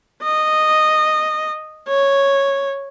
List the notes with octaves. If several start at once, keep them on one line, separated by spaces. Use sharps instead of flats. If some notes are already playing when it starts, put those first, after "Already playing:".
D#5
C#5